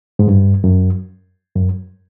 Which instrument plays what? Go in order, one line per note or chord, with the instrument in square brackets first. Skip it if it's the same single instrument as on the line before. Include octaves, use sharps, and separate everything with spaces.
[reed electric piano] G#2
G2
F#2
F#2